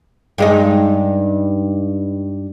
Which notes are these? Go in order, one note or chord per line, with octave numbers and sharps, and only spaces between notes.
G2 G#3 D#4